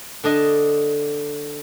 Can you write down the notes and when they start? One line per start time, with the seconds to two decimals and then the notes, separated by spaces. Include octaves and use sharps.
0.24 D3 D4 D#5